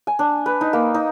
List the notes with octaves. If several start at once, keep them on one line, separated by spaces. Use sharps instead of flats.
G#5
D4
B4
D#4
A#3
D#4